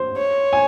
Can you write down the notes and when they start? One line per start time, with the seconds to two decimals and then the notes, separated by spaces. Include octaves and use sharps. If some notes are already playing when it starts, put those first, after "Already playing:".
Already playing: C5 C6
0.17 C#5
0.53 G#5